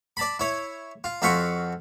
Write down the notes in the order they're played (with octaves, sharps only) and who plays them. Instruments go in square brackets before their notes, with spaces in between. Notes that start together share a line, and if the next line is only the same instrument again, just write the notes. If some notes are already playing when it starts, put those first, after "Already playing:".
[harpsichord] D5 A5 B5
E4 C#5
F4
F2 F#4 E5 F5 C6 C#6